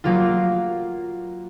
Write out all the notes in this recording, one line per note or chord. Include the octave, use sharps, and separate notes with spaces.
F#3 A#3 F4